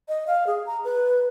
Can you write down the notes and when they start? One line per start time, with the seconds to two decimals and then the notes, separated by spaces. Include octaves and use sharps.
0.09 D#5
0.27 F5
0.47 G#4
0.66 A#5
0.85 B4